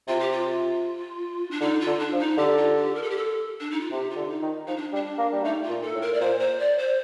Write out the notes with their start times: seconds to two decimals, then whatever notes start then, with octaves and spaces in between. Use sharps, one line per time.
0.08 C3 F4
0.20 G4
0.32 F4
1.50 D4
1.61 D3 D#4
1.80 F4
1.87 D3
1.99 D4
2.13 F3
2.19 D#4
2.37 D3 G4
2.57 F4
2.76 G4
2.95 A#4
3.02 A4
3.10 G4
3.17 A4
3.60 D4
3.71 D#4
3.80 F4
3.91 C3 G4
4.10 F4
4.16 D3
4.29 D#4
4.42 D#3
4.67 F3 D#4
4.76 D4
4.93 G3 D4
5.18 A#3
5.33 G3
5.44 A3 D#4
5.63 F4
5.70 A#2
5.82 A4
5.95 A2
6.01 A#4
6.13 D5
6.20 A#2 C5
6.39 C5
6.59 D5
6.78 C5